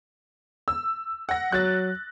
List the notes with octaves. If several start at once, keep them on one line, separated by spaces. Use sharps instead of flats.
E6
F#5 A#6
F#3 F#6 A6